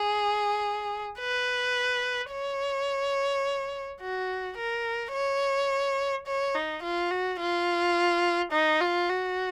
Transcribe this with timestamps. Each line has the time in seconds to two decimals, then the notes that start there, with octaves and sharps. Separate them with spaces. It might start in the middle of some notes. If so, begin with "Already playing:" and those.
Already playing: G#4
1.19 B4
2.32 C#5
4.01 F#4
4.58 A#4
5.13 C#5
6.27 C#5
6.55 D#4
6.83 F4
7.11 F#4
7.40 F4
8.52 D#4
8.80 F4
9.09 F#4